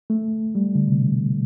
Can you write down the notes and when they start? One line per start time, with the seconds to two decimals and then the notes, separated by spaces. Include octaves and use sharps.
0.10 A3
0.55 G3
0.75 D3
0.88 C3
1.01 B2